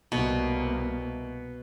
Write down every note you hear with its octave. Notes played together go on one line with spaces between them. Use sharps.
C2 B2 A#3